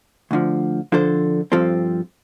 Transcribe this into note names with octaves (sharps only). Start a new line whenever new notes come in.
D2 D3 F3
D3 F3 D4 A4 C5
G2 F3 C4 A4